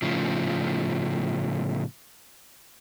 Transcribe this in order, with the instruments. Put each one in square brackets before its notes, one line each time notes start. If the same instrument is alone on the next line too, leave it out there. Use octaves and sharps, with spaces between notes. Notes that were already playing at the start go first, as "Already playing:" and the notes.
[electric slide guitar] A2 C#3 F3